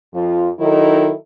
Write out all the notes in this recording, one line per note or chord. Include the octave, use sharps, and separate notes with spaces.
F2 F3 F4
D#3 F#3 D#4 E4 A4